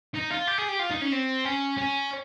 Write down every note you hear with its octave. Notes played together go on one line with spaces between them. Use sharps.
D#4
F4
G4
G#4
G4
F4
D#4
C#4
C4
C#4
C#4